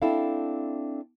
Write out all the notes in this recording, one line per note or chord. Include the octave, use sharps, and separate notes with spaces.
C4 D4 E4 A4 F5